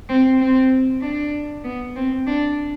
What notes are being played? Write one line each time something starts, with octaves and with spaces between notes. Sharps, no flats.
C4
C4
D4
B3
C4
D4